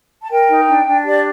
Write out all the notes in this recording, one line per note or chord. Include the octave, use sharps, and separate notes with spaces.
A5
A#4 G5
D#4
D4
D4
G4 D5